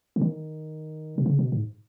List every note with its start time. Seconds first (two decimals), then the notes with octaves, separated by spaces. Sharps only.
0.16 C#3
0.21 D#3
1.18 B2
1.26 C#3
1.39 B2
1.52 G#2